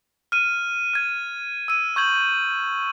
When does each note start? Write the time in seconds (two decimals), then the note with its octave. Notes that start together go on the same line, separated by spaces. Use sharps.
0.32 F6 D#7
0.94 F6 G#6
1.68 E6 D#7
1.96 C#6 G6 G#6 F#7